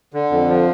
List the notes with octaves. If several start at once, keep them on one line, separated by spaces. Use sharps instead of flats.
D3
F2
F3